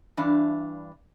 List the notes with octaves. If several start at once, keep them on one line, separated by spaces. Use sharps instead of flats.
G2 E3 D4 F5